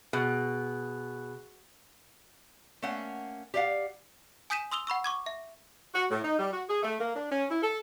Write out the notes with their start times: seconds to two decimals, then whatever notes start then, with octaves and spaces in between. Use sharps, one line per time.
0.13 B2 G#4 F#6
2.82 A3 A#3 C#4 F#5
3.54 G4 D5 D#5 F5 F#5
4.50 G#5 D#6 G6 B6 D#7 E7
4.72 C6 D#6 E6 F7 G7
4.87 F#5 B5 C#6 E6
5.04 C#6 D6 G#6
5.26 E5
5.95 F#4
6.10 A2
6.24 D#4
6.39 G3
6.52 F#4
6.69 G#4
6.83 A3
7.00 A#3
7.15 D4
7.31 C#4
7.50 E4
7.62 A4